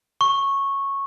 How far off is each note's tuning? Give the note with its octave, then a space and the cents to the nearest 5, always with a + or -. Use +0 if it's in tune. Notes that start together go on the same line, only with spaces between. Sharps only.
C#6 -10